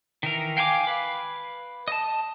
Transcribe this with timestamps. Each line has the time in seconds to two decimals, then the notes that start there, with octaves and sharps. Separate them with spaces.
0.23 D#3 E3 A#4
0.57 F5 G5 G#5 A#5 D6
0.87 B4 F5
1.88 D#5 A5